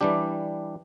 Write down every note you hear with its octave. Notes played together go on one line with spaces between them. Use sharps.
E3 G3 D4 G4